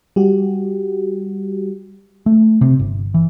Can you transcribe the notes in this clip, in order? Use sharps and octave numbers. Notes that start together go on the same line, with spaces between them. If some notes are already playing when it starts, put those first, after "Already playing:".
G3 F#4 G4
A3
C3
G1
E3